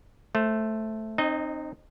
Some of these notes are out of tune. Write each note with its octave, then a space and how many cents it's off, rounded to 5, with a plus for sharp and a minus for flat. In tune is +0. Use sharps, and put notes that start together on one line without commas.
A3 +0 C5 +20
C4 +20 D#4 -25 D#5 +10